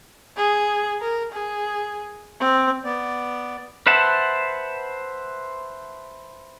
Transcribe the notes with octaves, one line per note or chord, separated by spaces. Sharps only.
G#4
A#4
G#4
C4
B3 D5
B4 C5 E5 F#5 A5